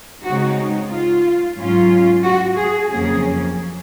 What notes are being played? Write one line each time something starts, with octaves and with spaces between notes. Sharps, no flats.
C#3 G#3 C4 D#4 F#4
F4
G#2 F#3 C#4 F4
F#4
G#4
F2 C#3 F#3 A#3 C#4 G#4